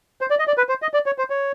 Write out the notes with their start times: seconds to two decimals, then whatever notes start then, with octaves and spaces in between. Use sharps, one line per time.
0.21 C5
0.30 D5
0.39 D#5
0.47 D5
0.57 B4
0.69 C5
0.82 D#5
0.94 D5
1.06 C#5
1.18 C5
1.30 C#5